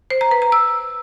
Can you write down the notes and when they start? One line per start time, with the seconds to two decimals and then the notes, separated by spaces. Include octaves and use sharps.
0.10 C5
0.21 A#5
0.31 B4
0.42 A#5
0.52 E6